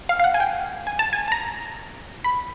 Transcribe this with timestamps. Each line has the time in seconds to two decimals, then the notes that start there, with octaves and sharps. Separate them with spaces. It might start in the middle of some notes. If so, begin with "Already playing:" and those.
0.09 F5
0.19 F5
0.24 F#5
0.34 G#5
0.40 G5
0.87 G#5
0.99 A5
1.13 G#5
1.28 A5
1.32 A#5
2.24 B5